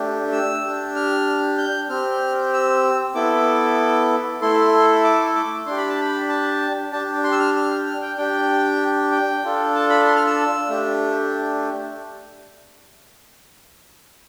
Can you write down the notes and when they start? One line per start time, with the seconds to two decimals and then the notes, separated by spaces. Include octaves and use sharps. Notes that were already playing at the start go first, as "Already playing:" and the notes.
Already playing: A3 D4 G4
0.32 E6
0.65 D4 G4
0.96 F6
1.58 G6
1.89 C4 G4 F6
2.53 E6
3.15 B3 E4 A4 D6
4.41 A3 E4 A4 C6
5.04 D6
5.35 D6
5.66 D4 G4 C6
5.77 B5
5.89 A5
6.01 B5
6.29 A5
6.92 D4 G4 A5
7.24 C6
7.32 E6
7.39 F6
7.56 F6
7.87 F6
8.02 G5
8.18 D4 G4 G5
9.12 G5
9.44 D4 F4 A4
9.75 A5
9.90 B5
10.07 C6
10.16 F6
10.27 E6
10.69 A3 D4 G4